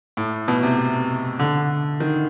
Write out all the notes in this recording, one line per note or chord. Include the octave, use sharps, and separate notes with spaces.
A2
B2
C3
D3
D#3